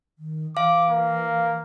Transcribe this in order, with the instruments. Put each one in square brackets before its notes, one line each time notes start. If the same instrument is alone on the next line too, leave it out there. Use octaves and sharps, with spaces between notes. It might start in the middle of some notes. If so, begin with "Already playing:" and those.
[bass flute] D#3
[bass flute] E3 [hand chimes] F5 [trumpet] D6
[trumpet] A#3